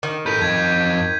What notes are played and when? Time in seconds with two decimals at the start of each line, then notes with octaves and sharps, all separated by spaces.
0.03 D#3
0.26 A4 B4 G6 B6 D#7
0.42 F2 D#5 G#6